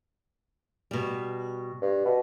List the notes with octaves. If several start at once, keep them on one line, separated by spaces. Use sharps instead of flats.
B2 G3
G2
B2